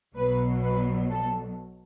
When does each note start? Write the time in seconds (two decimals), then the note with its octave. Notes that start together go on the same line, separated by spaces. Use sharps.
0.16 B1 B2 F#3 B4
0.64 B4
1.11 A4